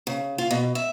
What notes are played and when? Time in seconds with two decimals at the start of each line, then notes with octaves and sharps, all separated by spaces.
0.07 C#3
0.38 F4
0.51 B2
0.75 E5